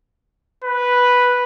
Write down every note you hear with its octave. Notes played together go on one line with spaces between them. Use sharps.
B4